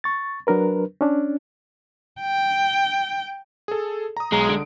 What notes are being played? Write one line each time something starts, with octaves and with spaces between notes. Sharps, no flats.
C#6 A6
F#3 D4 A#4 B4
C#4 D4
G5
G#4 A4
A#5 D#6
B1 G#3 A#5
D3 D7